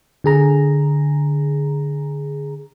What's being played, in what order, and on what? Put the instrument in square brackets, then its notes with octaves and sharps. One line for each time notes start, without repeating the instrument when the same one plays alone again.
[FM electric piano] D3 G#4 A#5